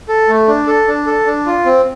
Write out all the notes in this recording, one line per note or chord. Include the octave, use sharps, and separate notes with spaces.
A4
A3
D4
A4
D4
A4
D4
F4
C4